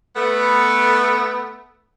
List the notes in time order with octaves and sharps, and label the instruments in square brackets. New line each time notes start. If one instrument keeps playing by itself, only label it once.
[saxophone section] A3 B3